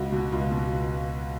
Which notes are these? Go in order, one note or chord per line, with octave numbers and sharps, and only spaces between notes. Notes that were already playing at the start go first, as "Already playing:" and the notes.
Already playing: C#2 F#4
B2
C#2 F4
B2